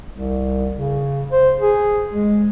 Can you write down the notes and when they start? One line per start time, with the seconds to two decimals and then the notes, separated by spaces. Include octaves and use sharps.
0.12 C2
0.75 C#3
1.32 C5
1.61 G#4
2.13 G#3